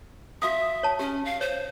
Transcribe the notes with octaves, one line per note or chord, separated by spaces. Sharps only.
F#4 E5 F5 D#6
C#5 A5
C#4 G4
F5
C5 C#5